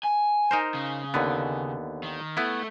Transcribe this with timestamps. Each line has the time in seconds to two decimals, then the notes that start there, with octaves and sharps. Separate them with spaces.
0.03 G#5
0.51 D#4 A#4 C5
0.74 C#3
1.14 D#2 D3 B3
2.03 D#3
2.37 A3 B3 E4